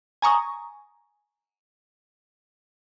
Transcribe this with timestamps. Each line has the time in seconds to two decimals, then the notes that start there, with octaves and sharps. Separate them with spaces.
0.22 G#5 A#5 C#6 D#6